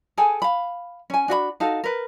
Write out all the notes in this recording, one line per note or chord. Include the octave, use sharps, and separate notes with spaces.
G#4 A4 G5 G#5
F5 B5
C#4 G#5
D4 F#4 D#5 B5
D#4 F#4 A4 F5
A#4 B4